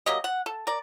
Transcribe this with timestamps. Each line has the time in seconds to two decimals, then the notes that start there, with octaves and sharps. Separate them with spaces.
0.06 F#3 A#3 G4 D#5
0.24 F#5
0.46 A4
0.67 A#4 D5